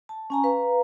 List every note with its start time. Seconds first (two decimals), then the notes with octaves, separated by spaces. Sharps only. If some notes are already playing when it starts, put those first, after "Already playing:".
0.09 A5
0.30 C#4 G#5 A#5
0.44 B4 F5 A#5